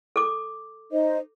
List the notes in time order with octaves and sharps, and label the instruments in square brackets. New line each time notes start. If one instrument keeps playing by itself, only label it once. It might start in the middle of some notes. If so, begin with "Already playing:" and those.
[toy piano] A4 D6
[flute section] D#4 C5 D#5